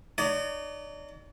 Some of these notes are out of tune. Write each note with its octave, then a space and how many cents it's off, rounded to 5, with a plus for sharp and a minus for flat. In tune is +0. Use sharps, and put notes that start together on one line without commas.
D#4 -40 D5 -45